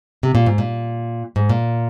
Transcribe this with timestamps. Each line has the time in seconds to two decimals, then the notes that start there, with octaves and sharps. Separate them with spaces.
0.23 C3
0.35 A#2
0.46 G#2
0.58 A#2
1.36 G#2
1.49 A#2